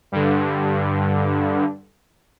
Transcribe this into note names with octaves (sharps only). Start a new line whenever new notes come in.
G2 D3